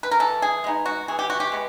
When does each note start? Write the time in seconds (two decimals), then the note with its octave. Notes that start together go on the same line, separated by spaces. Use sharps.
0.03 B4
0.11 A#4
0.20 E3 A4
0.42 G#4
0.64 G#3 B3 D#4
0.86 F#4
1.08 E3 G#4
1.19 G4
1.30 F#4
1.40 G4
1.52 G#3 B3